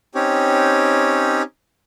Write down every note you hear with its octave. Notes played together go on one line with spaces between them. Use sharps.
C4 C#4 D#4 G4 C#5